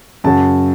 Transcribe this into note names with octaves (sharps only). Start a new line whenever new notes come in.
F#2 C#3 F#3 A5